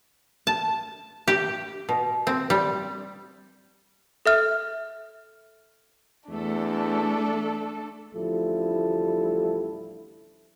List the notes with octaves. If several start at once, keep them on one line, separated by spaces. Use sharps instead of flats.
A5
G4
B2
C4
G3
A4 E5 F6
E2 A3 D4 A4
A1 D2 F3 G3 E4 A4